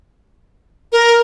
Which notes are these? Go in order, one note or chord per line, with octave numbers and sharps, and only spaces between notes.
A#4